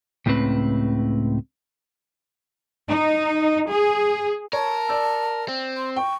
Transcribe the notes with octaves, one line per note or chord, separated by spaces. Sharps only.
C#2 A2 C#3 C4 B4
D#4
G#4
A#4 C#5 A5
D5 E6
C4
C6
G5 C#6